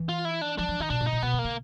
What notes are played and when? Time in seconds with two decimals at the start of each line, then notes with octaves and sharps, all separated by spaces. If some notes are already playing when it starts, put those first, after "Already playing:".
Already playing: E3
0.09 F4
0.25 E4
0.41 D4
0.58 F3 D4
0.69 F3
0.80 D#3 D#4
0.90 B2 D4
1.01 A#2
1.07 D#4
1.12 A#2
1.23 B2 B3
1.33 C3
1.39 A#3
1.44 C#3